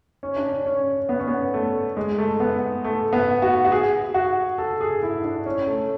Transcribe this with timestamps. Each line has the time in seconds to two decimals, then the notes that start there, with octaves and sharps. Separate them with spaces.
0.23 C#4
0.36 D4
0.49 C#4
0.66 C#4
1.09 B3
1.19 C#4
1.27 B3
1.54 A3
1.97 G#3
2.18 A3
2.40 B3
2.84 A3
3.13 B3
3.42 F#4
3.65 F#4
3.72 G#4
4.14 F#4
4.58 A4
4.81 G#4
5.03 E4
5.24 D4
5.46 C#4
5.67 A3